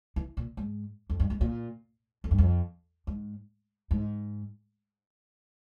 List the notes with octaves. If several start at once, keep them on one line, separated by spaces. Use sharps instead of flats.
E3
A#2
G#2
F2
G2
G#2
A#2
F2
G2
F2
G#2
G#2